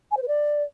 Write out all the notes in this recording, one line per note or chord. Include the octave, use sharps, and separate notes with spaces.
G#5
C5
B4
D5